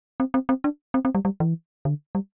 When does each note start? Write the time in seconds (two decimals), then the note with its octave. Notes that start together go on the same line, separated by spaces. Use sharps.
0.20 C4
0.34 C4
0.49 C4
0.64 D4
0.94 C4
1.05 C4
1.15 G3
1.25 G3
1.40 E3
1.85 D3
2.15 G3